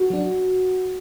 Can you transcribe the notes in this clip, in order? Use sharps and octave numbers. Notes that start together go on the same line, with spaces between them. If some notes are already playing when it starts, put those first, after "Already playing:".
Already playing: F#4
F#3 D4